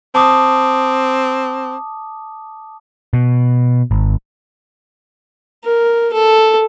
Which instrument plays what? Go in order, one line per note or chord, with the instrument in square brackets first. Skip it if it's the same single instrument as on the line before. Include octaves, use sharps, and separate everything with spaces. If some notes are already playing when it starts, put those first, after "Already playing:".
[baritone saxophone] C4 [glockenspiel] A5 D6 D#6
[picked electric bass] B2
G#1
[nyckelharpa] A#4
A4